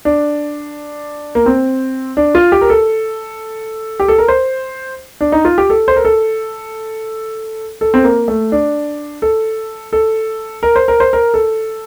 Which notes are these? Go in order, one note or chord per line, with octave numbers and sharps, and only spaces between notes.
D4
A#3
C4
D4
F4
G4
A#4
A4
G4
A4
A#4
C5
D4
D#4
F4
G4
A4
C5
A#4
A4
A4
C4
A#3
A3
D4
A4
A4
A#4
C5
A#4
C5
A#4
A4